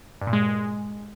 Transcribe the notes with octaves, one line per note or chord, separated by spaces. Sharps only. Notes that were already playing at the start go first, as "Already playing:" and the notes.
G2
A#2
G#3